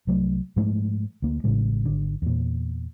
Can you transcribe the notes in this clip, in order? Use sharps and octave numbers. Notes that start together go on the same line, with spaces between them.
C2 F#3 A3
G#2 F3 G#3 A3
D2 A#3
A1 A2 C#3 G#3
G#1 D3
E2 A#2